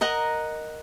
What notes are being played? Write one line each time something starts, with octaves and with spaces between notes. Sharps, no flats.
A#4 D#5 F#5 A#5